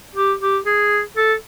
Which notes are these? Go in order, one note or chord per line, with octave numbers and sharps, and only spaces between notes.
G4
G4
G#4
A4